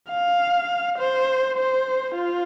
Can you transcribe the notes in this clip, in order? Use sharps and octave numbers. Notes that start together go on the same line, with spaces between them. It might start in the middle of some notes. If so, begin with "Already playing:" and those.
F5
C5
C5
F4